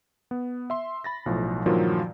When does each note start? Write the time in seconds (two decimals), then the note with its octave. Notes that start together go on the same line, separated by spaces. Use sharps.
0.31 B3
0.70 E5 C6
1.04 B5 A6 A#6
1.26 B1 A2 F3
1.66 G2 A#2 D#3 F3 F#3 F4